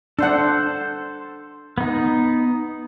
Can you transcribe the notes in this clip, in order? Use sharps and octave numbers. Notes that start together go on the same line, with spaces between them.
D4 A4 C5 F#5
B3 D#4